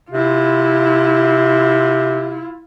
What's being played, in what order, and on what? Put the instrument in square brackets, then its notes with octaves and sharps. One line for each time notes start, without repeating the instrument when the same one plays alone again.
[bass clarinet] C3 [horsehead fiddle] E4 F4